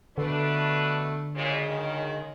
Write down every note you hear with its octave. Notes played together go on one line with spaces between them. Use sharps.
B2 D3 A3 D4 B4
A#2 C#3 F#3 G#3
D#3